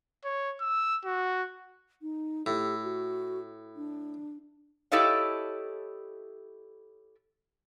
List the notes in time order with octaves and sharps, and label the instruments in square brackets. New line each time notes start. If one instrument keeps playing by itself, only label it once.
[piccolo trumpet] C#5
E6
F#4
[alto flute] D#4
[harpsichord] A2 [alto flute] G4
[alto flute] F#4
D4
[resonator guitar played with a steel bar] E4 G4 A4 C#5 D#5 F5